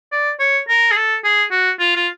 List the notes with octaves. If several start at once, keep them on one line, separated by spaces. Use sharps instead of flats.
D5
C#5
A#4
G#4
A4
G#4
F#4
F4
F4